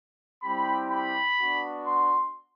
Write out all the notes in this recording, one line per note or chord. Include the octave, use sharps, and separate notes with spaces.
G3 C4 E4 G4 B5
B5
B3 D4 F#4
C6